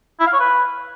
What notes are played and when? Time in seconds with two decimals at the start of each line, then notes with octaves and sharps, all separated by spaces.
0.20 E4
0.27 F5
0.33 C#5
0.40 B4